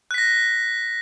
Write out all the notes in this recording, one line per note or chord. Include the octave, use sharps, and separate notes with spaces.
F#6 A#6 B6